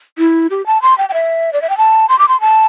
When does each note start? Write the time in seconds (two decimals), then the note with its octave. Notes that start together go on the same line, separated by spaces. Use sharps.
0.18 E4
0.51 G4
0.66 A5
0.82 C6
0.98 G5
1.09 G5
1.13 E5
1.53 D5
1.62 E5
1.69 G5
1.77 A5
2.09 C6
2.19 D6
2.28 C6
2.40 A5